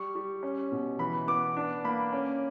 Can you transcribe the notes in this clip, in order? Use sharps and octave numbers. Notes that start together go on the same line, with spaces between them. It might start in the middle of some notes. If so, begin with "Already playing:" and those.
Already playing: G3 C#6
G3
C#4
B2
E3 B5
B3 D6
D4
A#3 B5
C#4